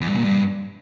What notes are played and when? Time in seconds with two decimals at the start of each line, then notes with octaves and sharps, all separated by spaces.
0.01 E2
0.09 G2
0.16 A#2
0.24 G2